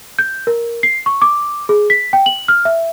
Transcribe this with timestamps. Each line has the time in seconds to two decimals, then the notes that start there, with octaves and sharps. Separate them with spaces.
0.19 G6
0.47 A#4
0.83 C7
1.06 C#6
1.22 D6
1.69 G#4
1.90 B6
2.13 G5
2.26 F#7
2.48 F6
2.65 E5